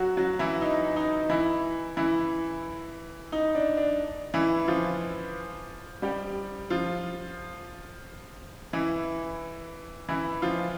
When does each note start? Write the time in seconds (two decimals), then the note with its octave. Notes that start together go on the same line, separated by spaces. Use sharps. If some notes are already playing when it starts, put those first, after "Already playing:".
Already playing: F#3 F#4
0.17 F#3 F#4
0.39 E3 E4
0.62 D#4
0.96 D#4
1.29 E3 E4
1.97 E3 E4
3.32 D#4
3.55 D4
3.77 D4
4.34 E3 E4
4.68 F3 F4
6.02 G3 G4
6.70 F3 F4
8.73 E3 E4
10.09 E3 E4
10.42 F3 F4